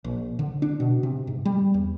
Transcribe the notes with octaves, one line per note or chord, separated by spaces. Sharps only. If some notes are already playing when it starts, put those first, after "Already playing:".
A#1
D3
D4
B2
C3
G#2
G3
E2